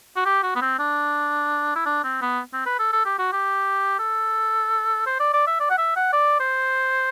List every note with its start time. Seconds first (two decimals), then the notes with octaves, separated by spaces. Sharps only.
0.16 F#4
0.25 G4
0.43 F#4
0.55 B3
0.62 C4
0.79 D4
1.75 E4
1.86 D4
2.04 C4
2.21 B3
2.53 C4
2.66 B4
2.79 A4
2.93 A4
3.05 G4
3.19 F#4
3.32 G4
3.99 A4
5.07 C5
5.20 D5
5.33 D5
5.47 E5
5.60 D5
5.70 F#5
5.78 E5
5.96 F#5
6.13 D5
6.40 C5